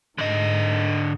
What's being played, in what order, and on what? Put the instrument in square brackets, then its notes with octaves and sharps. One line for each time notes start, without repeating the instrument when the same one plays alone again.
[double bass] G#2 [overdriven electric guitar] D3 D#5